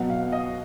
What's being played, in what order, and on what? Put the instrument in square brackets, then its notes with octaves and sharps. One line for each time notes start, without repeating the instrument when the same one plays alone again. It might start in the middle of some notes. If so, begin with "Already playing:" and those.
Already playing: [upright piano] B2 F#3 B3 F#5
F5
D#5